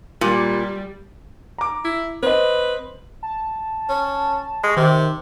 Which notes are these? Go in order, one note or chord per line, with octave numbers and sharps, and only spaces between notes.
A#2 G3
A#5 D6
E4
C4 B4 D#5
A5
C#4
G#3 C#6
C3 D#3